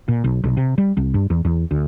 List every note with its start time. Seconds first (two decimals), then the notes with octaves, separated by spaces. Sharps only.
0.08 A#2
0.24 B1
0.44 B1
0.57 C3
0.78 G3
0.97 C2
1.14 G2
1.30 E2
1.45 E2
1.71 D2